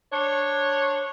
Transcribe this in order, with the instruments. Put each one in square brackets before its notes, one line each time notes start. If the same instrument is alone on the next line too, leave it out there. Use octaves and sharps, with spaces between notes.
[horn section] D4 C5 C#5